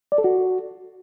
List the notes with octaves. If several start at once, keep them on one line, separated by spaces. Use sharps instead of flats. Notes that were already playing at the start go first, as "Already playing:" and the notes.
D5
A4
F#4